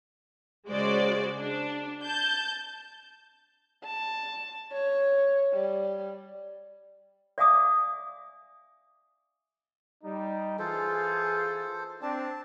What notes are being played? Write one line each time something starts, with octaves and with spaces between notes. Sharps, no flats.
C#3 G#3 F#4 C5 D5
D4
A5 G6
A5
C#5
G3
D5 E5 F5 G#5 D6 D#6
G3 D#4
E3 F4 G#4 A4 C5
C4 D4 A5